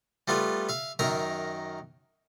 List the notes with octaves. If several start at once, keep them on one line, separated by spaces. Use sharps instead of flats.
G3 A3 B3 F4
E5 F5
F#2 D#3 A#4 E5 A#5